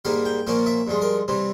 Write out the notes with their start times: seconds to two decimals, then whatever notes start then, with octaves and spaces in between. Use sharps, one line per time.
0.05 G#2 G3 A#3 F5
0.25 G5
0.47 A#2 F3 A#3 C#4 F5
0.66 E5
0.87 G2 F3 G#3
1.02 A#4
1.28 C3 E3 G3 C4